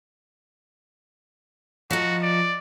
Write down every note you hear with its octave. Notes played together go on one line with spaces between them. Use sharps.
F3 D#4 F#4
D5